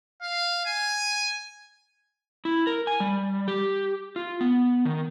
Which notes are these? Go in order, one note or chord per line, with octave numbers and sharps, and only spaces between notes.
F5
G#5
E4
A#4
G#5
G3
G4
F4
B3
D#3